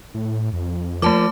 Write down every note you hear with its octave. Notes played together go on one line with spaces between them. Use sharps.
A2
F2
F3 A3 A#3 A5 D6